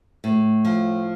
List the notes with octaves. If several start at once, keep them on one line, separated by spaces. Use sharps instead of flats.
A2
F3